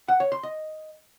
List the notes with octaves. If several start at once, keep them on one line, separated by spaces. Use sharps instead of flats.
F#5
C#5
C6
D#5